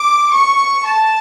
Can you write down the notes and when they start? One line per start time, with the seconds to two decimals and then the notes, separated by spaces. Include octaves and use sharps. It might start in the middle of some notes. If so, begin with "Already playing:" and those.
Already playing: D6
0.32 C#6
0.83 A5